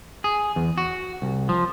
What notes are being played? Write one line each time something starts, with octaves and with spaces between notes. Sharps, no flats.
G#4
E2
F#4
C2
F3